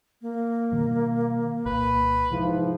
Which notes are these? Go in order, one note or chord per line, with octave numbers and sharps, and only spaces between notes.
A#3
B2 D#3 G3
C2 A#2 B4
G#2 C3 E3 F3